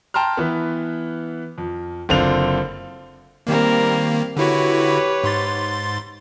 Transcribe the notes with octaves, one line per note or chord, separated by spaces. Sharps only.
G5 A5 A#5 C6 F6
E3 B3
F2
F#1 D3 C4 F4 F7
D#3 G3 A#3 C4 A#4
D3 E4 F#4 G4 B4 C#5
G#2 C6 A6